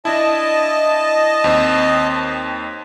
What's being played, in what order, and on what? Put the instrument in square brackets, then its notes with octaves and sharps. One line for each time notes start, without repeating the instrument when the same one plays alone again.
[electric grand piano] D4 E4 [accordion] D#5 A5
[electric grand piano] D#2 C4